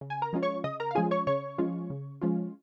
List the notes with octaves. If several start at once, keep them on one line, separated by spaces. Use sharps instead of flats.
C#3
G#5
A#4 A#5
F3 G#3 C#4 F4
C#5 C#6
C#3 D#5 D#6
A#4 A#5
F5
F3 G#3 C#4 F4 G#4 G#5
C#5 C#6
C#3 C#5 C#6
F3 G#3 C#4 F4
C#3
F3 G#3 C#4 F4